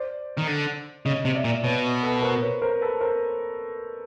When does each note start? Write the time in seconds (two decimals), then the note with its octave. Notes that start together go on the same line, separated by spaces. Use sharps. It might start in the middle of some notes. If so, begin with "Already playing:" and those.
Already playing: C5 D5
0.37 D#3
0.47 D3
1.05 C#3 C#5 D#5
1.25 C3
1.35 D5 E5
1.44 A#2
1.64 B2 B4 C#5
2.03 A4 B4
2.22 A#4 C5
2.42 B4 C#5
2.62 A#4 C5
2.81 A4 B4
3.01 A#4 C5